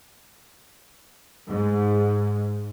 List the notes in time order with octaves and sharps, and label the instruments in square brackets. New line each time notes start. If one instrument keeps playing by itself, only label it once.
[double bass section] G#2